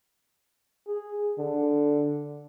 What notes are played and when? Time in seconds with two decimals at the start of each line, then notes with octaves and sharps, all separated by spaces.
0.88 G#4
1.38 D3